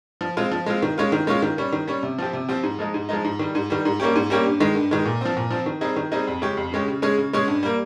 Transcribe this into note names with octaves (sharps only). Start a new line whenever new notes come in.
F3
G#3 C4 F4
F3
G#3 C4 F4
D#3
G#3 C#4 F4
D#3
G#3 C#4 F4
D#3
G3 C#4
D#3
G3 C#4
C3
F3 C4 G4
C3
F3 C4 G4
G#2
F3 G#3 D#4
G#2
F3 G#3 D#4
G#2
D#3 G3
G#2
D#3 G3
G#2
G3 A#3 C#4 G4
G#2
G3 A#3 C#4 G4
G2
D#3 G#3
G2
D#3 G#3
A#2
F3 C4
A#2
F3 C4
D#3
G3 C4 D#4 G#4
D#3
G3 C4 D#4 G#4
F2
C#3 G#3 C#4 G4
F2
C#3 G#3 C#4 G4
C#3
G#3 C#4 G#4
C#3
G#3 C#4 G#4
G2
G3 A#3